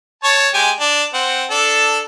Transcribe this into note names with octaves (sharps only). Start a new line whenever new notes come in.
C#5 A5 C#6
G#3 G4 G#5
D4
C4 F#5
D4 A4